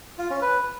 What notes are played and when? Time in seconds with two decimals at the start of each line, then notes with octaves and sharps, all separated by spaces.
0.18 F4
0.30 C#4
0.42 B4